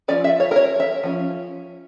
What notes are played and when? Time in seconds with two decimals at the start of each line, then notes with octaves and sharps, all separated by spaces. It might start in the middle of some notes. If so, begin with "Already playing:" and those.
0.08 F3 C#4 F4 D5
0.24 E5
0.40 C#5
0.51 A#4
0.56 C#5
0.80 E5
1.03 F3 C#4